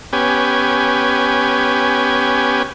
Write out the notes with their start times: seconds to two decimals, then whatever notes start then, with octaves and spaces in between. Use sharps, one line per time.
0.13 B3 C#4 G4 G#5